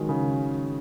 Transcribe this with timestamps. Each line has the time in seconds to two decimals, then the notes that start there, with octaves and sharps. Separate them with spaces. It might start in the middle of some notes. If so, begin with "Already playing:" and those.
Already playing: D#3 F#3 G#3
0.09 C#3